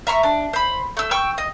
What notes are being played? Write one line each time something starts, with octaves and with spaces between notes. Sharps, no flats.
E5 A#5 C6 C#6
D4
C5 B5
A3 E6
G5 C#6 E6
D#5